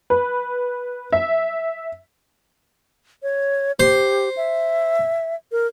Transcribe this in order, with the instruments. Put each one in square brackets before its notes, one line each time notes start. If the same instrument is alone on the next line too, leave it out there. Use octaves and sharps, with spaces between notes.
[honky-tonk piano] B4
E5
[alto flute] C#5
[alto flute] G4 [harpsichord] C5
[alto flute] E5
A#4